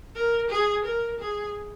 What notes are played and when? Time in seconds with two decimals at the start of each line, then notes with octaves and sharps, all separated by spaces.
0.15 A#4
0.50 G#4
0.84 A#4
1.20 G#4